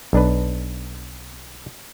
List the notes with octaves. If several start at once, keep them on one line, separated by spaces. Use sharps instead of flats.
B1 D4 B4